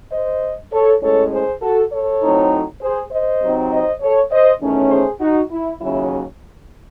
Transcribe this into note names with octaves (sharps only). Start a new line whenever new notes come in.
C5 D#5
A4 C#5
A2 G#3 C#4 A4 C#5
G#4 C5
F#4 A4
A4 C#5
A2 F#3 C4 D#4
G#4 C5
C5 D#5
C3 F#3 C4 D#4
C5 D#5
A4 C#5
C5 D#5
E2 D#3 A3 C#4
G#4 C5
D#4 F#4
E4
D#2 C#3 F#3 C#4 E4